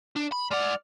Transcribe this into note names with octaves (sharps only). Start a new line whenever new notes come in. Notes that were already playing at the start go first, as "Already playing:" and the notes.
D4
B5
G#3 D5 F#5 F6